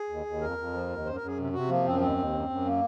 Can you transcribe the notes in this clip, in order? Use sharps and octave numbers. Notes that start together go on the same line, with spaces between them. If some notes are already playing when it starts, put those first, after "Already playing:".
Already playing: G#4
D#2
D#2
F2 A#4
F2
F3
D#2
F#2 C5
A#4
F#2
G#4
C3
C3 F#4
F3 A#3
F#2 C4
D#2 C4
D#2
F#2
F#2
A#3